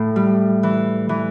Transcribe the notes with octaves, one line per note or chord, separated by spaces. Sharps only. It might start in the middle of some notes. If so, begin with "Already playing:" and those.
Already playing: A2
G3
E3
E3